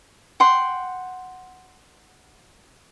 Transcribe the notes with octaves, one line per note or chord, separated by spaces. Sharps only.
F#5 G5 C6